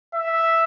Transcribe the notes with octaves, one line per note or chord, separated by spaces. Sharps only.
E5